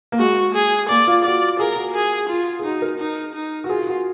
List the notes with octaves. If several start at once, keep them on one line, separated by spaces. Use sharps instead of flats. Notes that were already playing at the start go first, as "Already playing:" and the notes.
A#3
G#3 F#4
G#4
A#3 D5
F4
F#4 D5
G#4 A#4
F#4
G#4
F4
G#4
D#4 F#4
A#4
D#4
D#4
F#4
F4 G#4
F#4